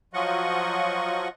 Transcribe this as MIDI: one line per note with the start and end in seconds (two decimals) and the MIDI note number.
0.14 1.28 53
0.14 1.28 54
0.14 1.28 65
0.14 1.28 75
0.14 1.28 78
0.14 1.28 85